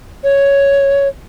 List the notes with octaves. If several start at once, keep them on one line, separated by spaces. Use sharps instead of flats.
C#5